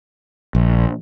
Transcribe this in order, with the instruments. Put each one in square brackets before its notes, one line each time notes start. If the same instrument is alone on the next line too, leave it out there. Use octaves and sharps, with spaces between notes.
[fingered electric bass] A#1